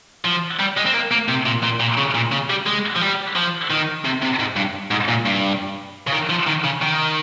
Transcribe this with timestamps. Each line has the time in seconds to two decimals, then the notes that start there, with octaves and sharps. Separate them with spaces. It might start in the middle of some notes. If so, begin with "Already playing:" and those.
0.25 F3
0.59 G3
0.77 G#3
0.86 C4
0.94 A#3
1.11 A#3
1.28 C3
1.46 A#2
1.63 A#2
1.80 A#2
1.97 C#3
2.15 A#2
2.32 C#3
2.50 G3
2.66 G#3
2.95 F3
3.01 G3
3.36 F3
3.70 D#3
4.05 C3
4.22 C3
4.39 G#2
4.56 G2
4.91 G#2
5.08 A#2
5.26 G2
6.07 C#3
6.12 D#3
6.29 F3
6.47 D#3
6.64 C#3
6.82 D#3